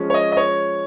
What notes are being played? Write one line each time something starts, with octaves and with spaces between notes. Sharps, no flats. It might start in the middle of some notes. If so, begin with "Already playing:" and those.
Already playing: F3 G#3 C#4
C#5
D#5
D#5
C#5